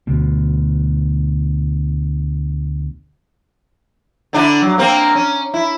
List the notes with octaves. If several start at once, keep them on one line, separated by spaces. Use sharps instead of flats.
D2 B2
D3 D4 E4
F#3
A#3 C4
C#4
E4